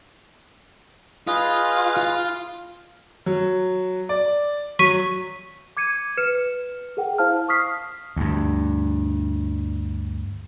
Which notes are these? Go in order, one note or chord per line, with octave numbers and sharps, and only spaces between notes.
F4 G#4 B4 D#5
F4
F#3
D5
F#3 C#6 B6 D#7
D6 G#6 C#7 D#7
B4 F6 C#7 E7
G#4 A#4 F#5 G5
E4 C5 F5 A5 F6
C#6 D#6 F6 B6 C7
D2 G2